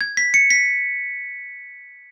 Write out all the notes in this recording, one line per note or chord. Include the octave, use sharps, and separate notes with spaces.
G#6
B6
C#7
B6